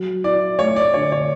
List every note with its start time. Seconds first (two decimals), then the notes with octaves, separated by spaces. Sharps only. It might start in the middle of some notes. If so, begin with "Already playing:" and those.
Already playing: F#3
0.24 E4 D5
0.59 A3 C#5
0.76 D5
0.94 D3 C#5
1.12 C#5